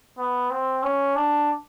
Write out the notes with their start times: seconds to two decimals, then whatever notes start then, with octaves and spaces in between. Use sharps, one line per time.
0.18 B3
0.51 C4
0.83 C#4
1.16 D4